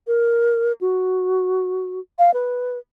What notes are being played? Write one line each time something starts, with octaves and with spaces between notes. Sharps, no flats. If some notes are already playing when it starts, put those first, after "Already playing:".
A#4
F#4
F5
B4